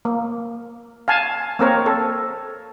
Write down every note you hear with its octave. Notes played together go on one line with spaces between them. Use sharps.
A#3
F5 G#5 A5
A#3 C4 A#4 C#5
A4